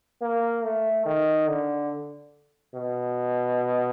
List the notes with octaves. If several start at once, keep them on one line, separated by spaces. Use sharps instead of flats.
A#3
A3
D#3
D3
B2